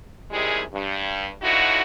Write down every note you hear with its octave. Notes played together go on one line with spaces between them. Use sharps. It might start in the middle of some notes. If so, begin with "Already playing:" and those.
C3 D#3 G3 G#3 E4 G#4
G2
D3 F3 D#4 E4 F#4